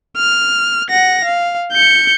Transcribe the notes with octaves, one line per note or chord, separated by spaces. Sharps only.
F6
F#5 A#6
F5
G6 C#7